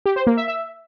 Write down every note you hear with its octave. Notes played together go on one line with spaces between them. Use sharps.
G4
C5
A#3
E5
E5